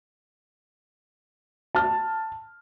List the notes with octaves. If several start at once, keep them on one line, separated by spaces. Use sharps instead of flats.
A5 F6